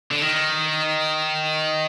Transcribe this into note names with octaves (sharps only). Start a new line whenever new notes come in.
D3
D#3